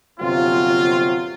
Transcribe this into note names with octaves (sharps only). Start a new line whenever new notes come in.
G1 C3 F#3 C4 F4